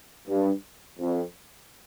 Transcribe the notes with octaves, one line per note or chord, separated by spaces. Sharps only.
G2
F2